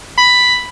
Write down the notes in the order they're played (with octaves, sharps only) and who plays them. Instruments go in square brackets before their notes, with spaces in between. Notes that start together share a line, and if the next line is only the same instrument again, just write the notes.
[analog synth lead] B5